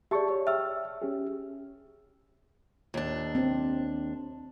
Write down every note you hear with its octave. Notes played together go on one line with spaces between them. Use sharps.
G4 G#4 D5 E5 A5 C#6
C#5
E5 G5 E6 F6
C#4 G4 G#4
D#2 D4
C4